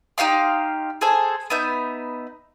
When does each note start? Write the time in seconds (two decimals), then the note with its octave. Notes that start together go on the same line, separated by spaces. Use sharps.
0.18 D#4 G4 F5 C6
1.01 G#4 A4 C5 G#5
1.50 B3 D#4 E5 G6